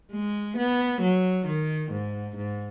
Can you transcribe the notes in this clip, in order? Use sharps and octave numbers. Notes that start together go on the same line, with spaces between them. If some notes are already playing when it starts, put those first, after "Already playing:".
G#3
B3
F#3
D#3
G#2
G#2